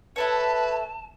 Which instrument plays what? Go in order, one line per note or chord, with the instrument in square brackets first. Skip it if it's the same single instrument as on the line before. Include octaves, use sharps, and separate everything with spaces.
[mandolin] E4 A4 C#5 [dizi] B4 [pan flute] A5